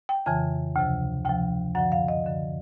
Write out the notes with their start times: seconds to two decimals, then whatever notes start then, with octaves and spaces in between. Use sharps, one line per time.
0.09 G5
0.26 F2 C#3 E3 G#5
0.76 D2 C3 F3
1.25 D2 C3 F3 G5
1.75 F#2 D3 F3 F#5
1.92 F5
2.08 D#5
2.24 F#2 D3 F3